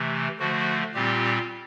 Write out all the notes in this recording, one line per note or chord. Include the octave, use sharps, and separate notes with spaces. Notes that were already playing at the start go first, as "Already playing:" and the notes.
Already playing: C3 E3 A3
D3 F3 A3 F#4
A#2 G3 C4 F4 G4